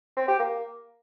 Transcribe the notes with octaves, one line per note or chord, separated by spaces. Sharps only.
C4
G4
A#3